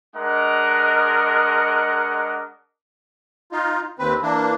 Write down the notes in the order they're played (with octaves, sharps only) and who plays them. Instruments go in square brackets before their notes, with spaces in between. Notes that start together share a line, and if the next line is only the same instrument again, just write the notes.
[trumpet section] G#3 D4 A#4 D#5 F#5
[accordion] D#4 F4
D#2 C4 B4
E3 A#3 D4